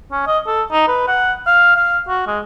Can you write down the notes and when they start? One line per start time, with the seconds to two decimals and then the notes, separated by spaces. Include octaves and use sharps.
0.12 C#4
0.26 D#5
0.47 A4
0.71 D#4
0.88 B4
1.08 F#5
1.46 F5
1.76 F5
2.08 F#4
2.27 G#3